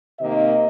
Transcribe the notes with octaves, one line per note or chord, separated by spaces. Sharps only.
C3 D#3 A#3 D#5